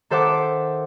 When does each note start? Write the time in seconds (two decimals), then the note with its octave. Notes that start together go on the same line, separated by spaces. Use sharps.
0.10 D#3 A4 C5 E5 F#5 D6